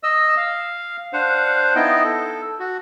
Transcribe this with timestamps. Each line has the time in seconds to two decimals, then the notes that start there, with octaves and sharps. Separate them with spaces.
0.03 D#5 E6
0.37 F5
1.13 D4 C5 F5 F#5
1.75 B3 D#4 E4 D#5 G5
2.04 A4
2.60 F#4